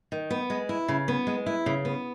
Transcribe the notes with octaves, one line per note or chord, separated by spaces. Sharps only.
D#3
B3
G#3
E4
C#3
B3
G#3
E4
C#3
B3